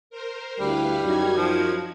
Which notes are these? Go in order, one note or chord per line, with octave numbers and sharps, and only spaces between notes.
A#4 C5
D2 G3 E4 B4 F5
F#2 D#4 F#4 G#6
F3